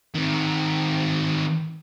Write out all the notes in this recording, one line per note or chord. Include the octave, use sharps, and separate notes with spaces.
D#3 C4